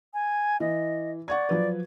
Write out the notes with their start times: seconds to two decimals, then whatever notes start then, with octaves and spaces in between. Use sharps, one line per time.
0.14 G#5
0.60 E3 D#5
1.28 D5 F#5 C#6 G#6
1.49 F3 F#3 B4